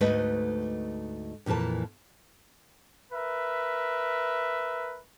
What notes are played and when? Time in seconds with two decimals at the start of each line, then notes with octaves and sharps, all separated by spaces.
0.01 D2 G#2 A3 B4 D#5
1.46 F2 A#2 E3 A#4 A5
3.13 A#4 B4 E5